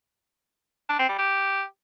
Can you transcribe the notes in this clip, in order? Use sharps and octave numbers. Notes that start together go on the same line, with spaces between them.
D4
C4
G3
G4